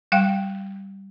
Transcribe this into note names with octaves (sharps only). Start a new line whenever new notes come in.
G3 F5 G5